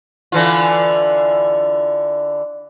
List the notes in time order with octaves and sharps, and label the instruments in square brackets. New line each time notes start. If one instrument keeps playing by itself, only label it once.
[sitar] D3 E3 F4